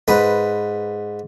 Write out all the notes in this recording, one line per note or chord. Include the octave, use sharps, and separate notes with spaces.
G#2 B4